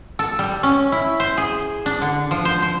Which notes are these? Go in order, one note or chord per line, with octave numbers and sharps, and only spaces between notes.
A4
G3
C#4
E4
C5
G#4
D4
D3
F3
C5
C5